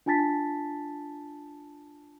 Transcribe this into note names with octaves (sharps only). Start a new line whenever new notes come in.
D4 F4 G#5 A5 A6 B6